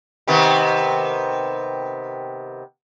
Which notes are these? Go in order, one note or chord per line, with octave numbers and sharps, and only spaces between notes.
C3 D#3 B3